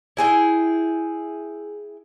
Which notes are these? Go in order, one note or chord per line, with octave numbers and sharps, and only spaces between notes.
E4 G#4 B4 G5